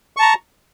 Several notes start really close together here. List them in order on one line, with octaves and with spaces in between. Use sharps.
C#6 A5 A#5